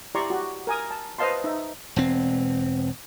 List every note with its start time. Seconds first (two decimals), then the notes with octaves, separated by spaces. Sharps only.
0.15 E4 G4 D5 A#5 C6 C#6
0.30 F#4 G4
0.67 A#4 G#5 D#6
0.91 A5
1.18 B4 C5 D#5 F5 A5 C6
1.44 D#4 E5
1.96 E1 C4